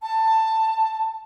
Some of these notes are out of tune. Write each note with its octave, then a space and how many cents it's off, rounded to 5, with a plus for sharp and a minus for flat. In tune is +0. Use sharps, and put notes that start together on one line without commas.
A5 +15